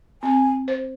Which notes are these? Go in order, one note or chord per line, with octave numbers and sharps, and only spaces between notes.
C4 G#5
C5